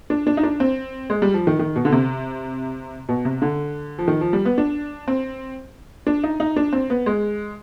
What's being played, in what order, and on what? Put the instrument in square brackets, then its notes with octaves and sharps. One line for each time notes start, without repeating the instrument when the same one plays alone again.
[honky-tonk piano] D4
D4
D#4
D4
C4
G#3
G3
F3
D#3
D#3
B2
D3
C3
B2
C3
D3
F3
D#3
F3
G3
B3
D4
C4
D4
D#4
D#4
D4
C4
B3
G#3